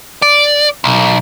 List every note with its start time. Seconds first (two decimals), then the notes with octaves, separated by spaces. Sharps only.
0.22 D5
0.84 B1